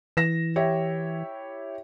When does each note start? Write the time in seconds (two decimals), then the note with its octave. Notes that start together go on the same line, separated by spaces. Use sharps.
0.17 E3 A#6 E7
0.56 E4 G4 C#5